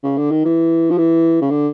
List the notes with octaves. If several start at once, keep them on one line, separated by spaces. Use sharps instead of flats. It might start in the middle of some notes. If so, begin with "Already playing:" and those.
C#3
D3
D#3
E3
F3
E3
C#3
D3